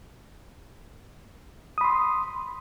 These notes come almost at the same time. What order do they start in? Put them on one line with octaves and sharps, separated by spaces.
D#6 B5 C6